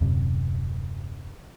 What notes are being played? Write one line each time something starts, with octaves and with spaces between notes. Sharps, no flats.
D#1 F#2 C3